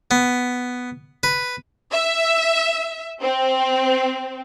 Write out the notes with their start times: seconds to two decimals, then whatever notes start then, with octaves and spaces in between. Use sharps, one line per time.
0.11 B3
1.23 B4
1.92 E5
3.22 C4